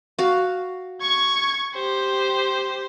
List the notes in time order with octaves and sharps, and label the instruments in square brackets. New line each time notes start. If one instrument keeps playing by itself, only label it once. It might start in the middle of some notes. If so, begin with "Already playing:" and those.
[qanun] F#4 F5
[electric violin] C#6 G#6
G4 C5